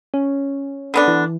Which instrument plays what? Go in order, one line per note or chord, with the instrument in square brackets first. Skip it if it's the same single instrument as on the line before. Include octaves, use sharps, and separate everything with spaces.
[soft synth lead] C#4
[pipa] D3 B3 D4
[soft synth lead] E3